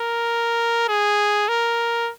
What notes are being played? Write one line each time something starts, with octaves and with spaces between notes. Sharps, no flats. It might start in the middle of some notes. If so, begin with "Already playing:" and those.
Already playing: A#4
G#4
A#4